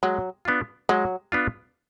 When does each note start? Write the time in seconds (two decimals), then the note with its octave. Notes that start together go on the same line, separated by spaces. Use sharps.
0.03 F#3 G#3
0.45 B3 D4 F4
0.89 F#3 G#3
1.32 B3 D4 F4